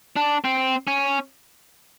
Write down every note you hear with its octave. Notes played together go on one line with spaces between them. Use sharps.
D4
C4
C#4